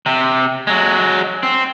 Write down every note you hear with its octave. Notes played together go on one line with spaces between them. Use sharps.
C3
F#3 G#3
C4